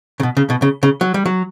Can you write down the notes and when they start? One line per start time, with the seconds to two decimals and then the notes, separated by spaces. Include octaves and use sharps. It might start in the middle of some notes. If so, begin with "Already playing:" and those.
0.20 C#3
0.23 B2
0.37 C#3
0.50 B2
0.62 C#3
0.83 C#3
1.01 F#3
1.14 G3
1.26 F#3